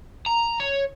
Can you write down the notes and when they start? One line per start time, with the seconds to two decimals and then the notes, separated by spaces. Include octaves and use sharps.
0.26 A#5
0.60 C#5